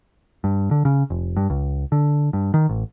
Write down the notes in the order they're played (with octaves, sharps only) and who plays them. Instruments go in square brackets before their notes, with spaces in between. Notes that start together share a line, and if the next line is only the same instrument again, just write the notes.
[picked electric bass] G2
D3
C#3
F1
G2
C#2
D3
G2
D#3
A1